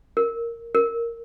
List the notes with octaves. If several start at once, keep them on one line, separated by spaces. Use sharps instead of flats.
A#4
A#4